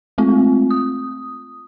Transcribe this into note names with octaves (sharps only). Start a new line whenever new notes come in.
G#3 A3 C4 F4
D#6